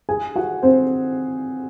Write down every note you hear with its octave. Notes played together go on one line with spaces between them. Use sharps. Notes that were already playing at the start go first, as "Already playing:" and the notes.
G#4 G#5
F#4 F#5
C4 C5